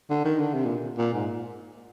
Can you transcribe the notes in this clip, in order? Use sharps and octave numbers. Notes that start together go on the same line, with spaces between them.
D3
D#3
D3
C3
A#2
A#2
G#2